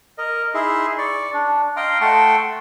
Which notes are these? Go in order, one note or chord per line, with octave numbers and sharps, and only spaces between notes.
A#4 D#5
D#4 E4 G#4 E5 C6
D5 C#6
D4
D#5 F5 G5 A#5 C6
A3 F#5 G5 A5 C6 C#6